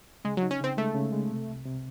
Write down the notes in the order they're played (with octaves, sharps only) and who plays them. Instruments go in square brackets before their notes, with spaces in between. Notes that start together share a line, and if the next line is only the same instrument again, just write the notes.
[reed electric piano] C#3 [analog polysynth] G#3
[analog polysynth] F#3
[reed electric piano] D#4
[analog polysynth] C#4
[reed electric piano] C#3 [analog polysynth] C4
[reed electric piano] G#3 [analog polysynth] A3
[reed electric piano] C#3
G#3
C3
C2
C3